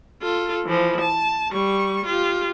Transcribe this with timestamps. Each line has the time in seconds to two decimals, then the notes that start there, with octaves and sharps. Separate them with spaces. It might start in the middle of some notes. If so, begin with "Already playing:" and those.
0.22 F4 A4
0.65 E3 F3
1.01 A5
1.51 G3 C#6
2.06 F4 G4